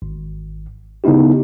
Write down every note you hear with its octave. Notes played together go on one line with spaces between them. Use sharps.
G#1
C#3 B3 D#4 E4 G4